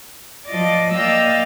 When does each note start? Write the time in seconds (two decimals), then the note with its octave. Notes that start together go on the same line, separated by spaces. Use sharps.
0.47 F3 D5 D#5 D6
0.95 A#3 D5 D#5 F5 G5 E6